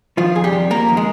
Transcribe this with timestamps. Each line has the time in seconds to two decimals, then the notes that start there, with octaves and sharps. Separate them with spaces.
0.17 D#3 F3 F4
0.35 F2 G#4
0.44 G3 G4
0.52 C3
0.70 F2 A#3 A#4
0.88 D#3
0.97 G#3